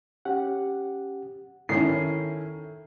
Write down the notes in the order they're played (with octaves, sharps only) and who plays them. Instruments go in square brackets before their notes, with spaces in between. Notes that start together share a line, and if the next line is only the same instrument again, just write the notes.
[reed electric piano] C#4 G4 F#5
[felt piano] D#3 C#4 E4 [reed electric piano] A4 [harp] C7